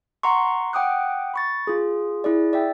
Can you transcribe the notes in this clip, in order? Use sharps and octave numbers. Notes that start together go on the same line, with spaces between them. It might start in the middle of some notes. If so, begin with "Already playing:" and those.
F#5 A#5 C6 C#6
F#5 G5 D6 D#6 F#6
B5 C#6 A6
F4 G#4
E4 G#4 D5
D5 E5 G5